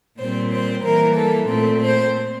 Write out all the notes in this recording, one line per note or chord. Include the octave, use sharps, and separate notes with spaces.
A#2 G3 C4 C5
C5
E3 G3 A#3 A#4
A4
A#2 A3 C4 A4
C5